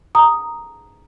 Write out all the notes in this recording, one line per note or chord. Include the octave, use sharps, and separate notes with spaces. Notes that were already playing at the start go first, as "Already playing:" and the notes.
A#5 D#6